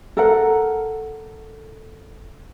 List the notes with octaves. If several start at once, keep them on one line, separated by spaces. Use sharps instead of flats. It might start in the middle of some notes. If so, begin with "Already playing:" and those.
A4 A#4 F#5